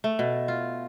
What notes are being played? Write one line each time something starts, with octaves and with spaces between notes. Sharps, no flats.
A3
B2
F4